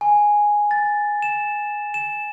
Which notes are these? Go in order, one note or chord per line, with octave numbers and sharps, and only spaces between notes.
G#5
A6
E7
E7